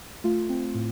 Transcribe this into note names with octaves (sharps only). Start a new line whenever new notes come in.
A3 F4
C4
A2